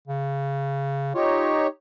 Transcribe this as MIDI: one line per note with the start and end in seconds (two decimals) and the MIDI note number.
0.08 1.12 49
1.15 1.67 63
1.15 1.53 65
1.15 1.67 67
1.15 1.67 73